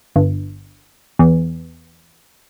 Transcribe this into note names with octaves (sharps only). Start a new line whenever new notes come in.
G1
E2